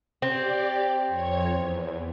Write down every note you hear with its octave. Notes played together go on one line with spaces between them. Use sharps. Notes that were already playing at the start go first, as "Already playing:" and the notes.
C4 G4 D5
F2 C#5 G#6
E2